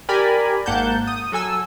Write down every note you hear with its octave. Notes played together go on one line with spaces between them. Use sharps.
G4 A#4 D5 G#5 B5
G#1 A#3 F#5 A5 G6
D#6
F#3 A4 G#5 E6